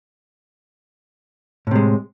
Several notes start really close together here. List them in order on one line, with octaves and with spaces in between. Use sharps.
A2 C3 G#3